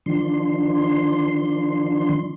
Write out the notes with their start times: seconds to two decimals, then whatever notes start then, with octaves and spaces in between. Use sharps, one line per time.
0.06 D#3 F3 D4 C6